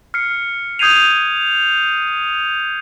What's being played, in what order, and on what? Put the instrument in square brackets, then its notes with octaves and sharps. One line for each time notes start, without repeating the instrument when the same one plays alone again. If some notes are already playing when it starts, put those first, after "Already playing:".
[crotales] F6 C7 C#7
D#6 G6 G#6 C7 D#7 F7